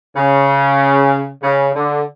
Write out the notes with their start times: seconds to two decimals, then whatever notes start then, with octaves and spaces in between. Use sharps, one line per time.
0.16 C#3
1.43 C#3
1.75 D3